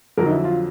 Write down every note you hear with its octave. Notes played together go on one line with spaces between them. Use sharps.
F2 D3 F#3 A#4
D#4
E4
F4